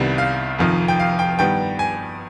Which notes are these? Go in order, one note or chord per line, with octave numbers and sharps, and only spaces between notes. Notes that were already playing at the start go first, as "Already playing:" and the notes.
Already playing: C2 C3 D#3 G3 B3
F5
F1 F2 D#3
G5
F5
G5
G2 D#3 G3 B3 G5
G#5